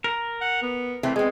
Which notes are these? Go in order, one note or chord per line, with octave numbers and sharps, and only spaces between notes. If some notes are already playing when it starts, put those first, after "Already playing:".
A#4
F#5
B3
E3 A3 C4
G#3 B3 C4